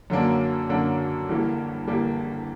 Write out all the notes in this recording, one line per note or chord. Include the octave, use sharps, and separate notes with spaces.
F#2 D3 F#3 A#3 D4
F#2 D3 F#3 A#3 D4
G1 G2 E3 G3 A#3
G1 G2 E3 G3 A#3